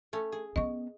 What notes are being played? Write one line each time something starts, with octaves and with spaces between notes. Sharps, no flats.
A3 C#4
G#4
B3 C#4 D#5 C#6